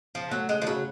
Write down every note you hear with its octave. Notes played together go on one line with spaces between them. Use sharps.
C#3 F3
F#3 A3
C#3 G#3
F3
C#3 F#3